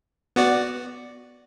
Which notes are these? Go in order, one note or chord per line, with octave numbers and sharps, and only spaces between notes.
B3 F#4 D5